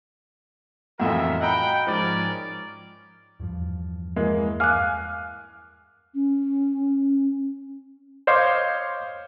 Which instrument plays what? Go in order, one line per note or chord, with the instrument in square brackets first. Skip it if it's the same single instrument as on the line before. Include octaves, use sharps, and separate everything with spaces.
[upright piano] F2 A2 E3 [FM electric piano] F4 F#4 [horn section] A#4 D#5 E5
[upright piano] D#5 A#5 B5 [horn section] F#5 G5
[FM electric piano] G#2 F3 [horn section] C#4 A#4 D5
[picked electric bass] E2 G2 F3
[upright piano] E3 G#3 A#3
[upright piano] F5 G#5 D6 [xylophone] F6 F#6
[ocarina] C#4
[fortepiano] C5 C#5 D#5 F5 C6 D6